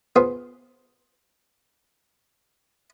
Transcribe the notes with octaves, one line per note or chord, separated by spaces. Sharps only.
B3 F4 G#4 B4 C5